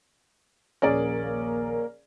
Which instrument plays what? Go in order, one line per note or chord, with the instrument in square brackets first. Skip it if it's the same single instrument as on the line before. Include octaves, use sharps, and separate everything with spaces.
[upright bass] A#1 D#2 [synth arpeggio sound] A#3 A#4 [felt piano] C#4 G#4 D5